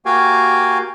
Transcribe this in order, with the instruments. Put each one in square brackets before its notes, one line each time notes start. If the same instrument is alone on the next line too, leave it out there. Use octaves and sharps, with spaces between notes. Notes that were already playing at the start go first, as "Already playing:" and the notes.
[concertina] A#3 F#4 G4 F5 G5 G#5